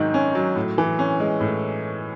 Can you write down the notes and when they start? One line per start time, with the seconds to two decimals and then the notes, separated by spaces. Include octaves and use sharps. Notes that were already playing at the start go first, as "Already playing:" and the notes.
Already playing: G#2 D#3 F#3
0.14 C#4
0.35 F#3
0.56 A2
0.78 E3
0.99 C#4
1.20 G#3
1.41 A2